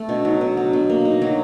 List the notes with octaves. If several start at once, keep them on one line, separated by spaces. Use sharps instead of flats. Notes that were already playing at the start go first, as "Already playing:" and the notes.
Already playing: A3
B2 D4
F#3 D#4
B2 D4
F#3
B2
A#3
D#4
F#3